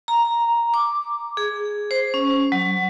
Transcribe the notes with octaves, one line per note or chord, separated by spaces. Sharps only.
A#5
D6
G#4
C5
C#4
F#3